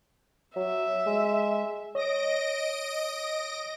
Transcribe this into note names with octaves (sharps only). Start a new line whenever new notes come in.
F#3 E5
G#3
C#5 D#5 A#6 D7